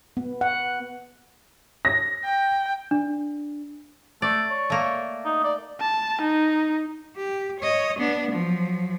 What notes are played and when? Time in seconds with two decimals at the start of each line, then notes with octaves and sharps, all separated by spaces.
0.17 B3
0.41 F#5
1.85 A#6
2.25 G5
2.91 D4
4.22 A3 D5
4.50 C#5
4.70 A3 A#3
5.25 D#4
5.44 D5
5.80 A5
6.21 D#4
7.16 G4
7.60 C#5 D#5
7.99 B3 D4
8.31 F3 F#3